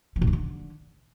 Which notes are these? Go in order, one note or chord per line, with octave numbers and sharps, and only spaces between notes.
E3
A#2
C#3
D3